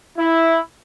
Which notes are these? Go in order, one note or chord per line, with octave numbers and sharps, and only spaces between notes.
E4